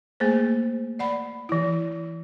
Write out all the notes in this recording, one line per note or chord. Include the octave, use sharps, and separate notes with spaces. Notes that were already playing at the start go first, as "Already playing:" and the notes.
A3 A#3 G#4 C5
D5 F#5 B5
E3 E4